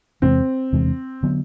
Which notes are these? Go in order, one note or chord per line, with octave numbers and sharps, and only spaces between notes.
E2 C3 E3 G#3 C4
E2 C3 E3 G#3
D3 F#3 B3